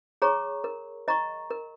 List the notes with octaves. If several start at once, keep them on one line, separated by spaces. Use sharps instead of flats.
G#4 C#5 A#5 C#6
A#4
D#5 A#5 C#6
A#4